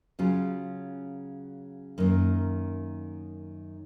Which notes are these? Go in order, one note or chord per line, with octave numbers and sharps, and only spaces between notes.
C#3 F#3 C#4 F4
F#2 D#3 A#3